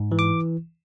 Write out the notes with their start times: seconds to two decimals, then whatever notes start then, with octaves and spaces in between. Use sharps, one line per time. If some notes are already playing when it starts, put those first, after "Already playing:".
Already playing: G#2
0.12 E3
0.19 D6